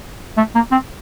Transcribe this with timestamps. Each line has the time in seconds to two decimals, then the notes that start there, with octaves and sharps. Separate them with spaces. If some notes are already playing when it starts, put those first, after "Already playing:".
0.37 A3
0.55 A#3
0.71 C4